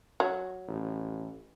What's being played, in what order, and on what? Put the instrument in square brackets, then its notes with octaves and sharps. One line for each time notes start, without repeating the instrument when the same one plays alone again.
[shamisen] F#3
[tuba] A1